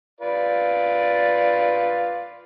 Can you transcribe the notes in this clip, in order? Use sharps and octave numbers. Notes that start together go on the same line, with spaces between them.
F4 B4 D5